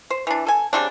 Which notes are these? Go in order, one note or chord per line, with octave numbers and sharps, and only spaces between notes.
C5
E3 D4
A4 G#5
C#3 G3 C4 D4